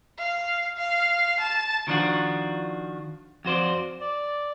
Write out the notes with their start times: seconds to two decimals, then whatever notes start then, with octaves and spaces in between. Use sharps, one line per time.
0.18 F5
0.77 F5
1.40 A5
1.88 D#3 F3 D4 F4 F#4
3.45 F2 F#4 C5 D5
4.01 D5